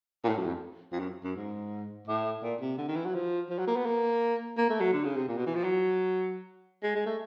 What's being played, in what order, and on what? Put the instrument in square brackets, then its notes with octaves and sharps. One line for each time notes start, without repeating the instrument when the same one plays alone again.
[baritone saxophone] A#2
A2
F#2
F2
F2
F#2
F#2
G#2
A2
A#2
C3
D3
D#3
E3
F#3
F3
F3
F#3
A#3
B3
A#3
A#3
A3
F#3
D3
C#3
C3
A#2
B2
E3
F3
F#3
G#3
G#3
A3